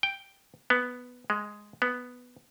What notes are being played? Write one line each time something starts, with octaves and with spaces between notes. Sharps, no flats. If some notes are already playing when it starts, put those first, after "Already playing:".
G5
B3
G#3
B3